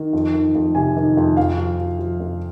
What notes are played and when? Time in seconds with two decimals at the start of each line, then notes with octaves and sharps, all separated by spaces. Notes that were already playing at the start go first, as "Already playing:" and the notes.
Already playing: D#3
0.13 F2
0.33 D#3
0.55 F2
0.75 C3 G#5
0.96 D#3
1.17 F2
1.37 F2 F5
1.58 F3
1.78 F3
1.99 F3
2.19 F2